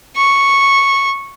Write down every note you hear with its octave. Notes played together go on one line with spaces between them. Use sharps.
C#6